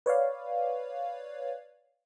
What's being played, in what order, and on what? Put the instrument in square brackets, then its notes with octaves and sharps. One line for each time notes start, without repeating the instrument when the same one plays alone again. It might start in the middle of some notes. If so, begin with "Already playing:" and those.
[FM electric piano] B4 C#5 D5 F5